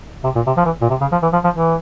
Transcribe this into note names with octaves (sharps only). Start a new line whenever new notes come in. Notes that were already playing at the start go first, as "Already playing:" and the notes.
C3
A#2
C3
F3
E3
A#2
C3
C#3
F3
E3
F3
F3
E3